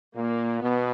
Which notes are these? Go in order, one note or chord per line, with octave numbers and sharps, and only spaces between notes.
A#2 A#3
B2 B3